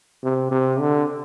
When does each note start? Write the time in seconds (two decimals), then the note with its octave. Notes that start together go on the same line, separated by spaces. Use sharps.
0.23 C3
0.51 C3
0.80 D3